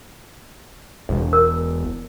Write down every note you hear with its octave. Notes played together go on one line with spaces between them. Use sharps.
E1
A#4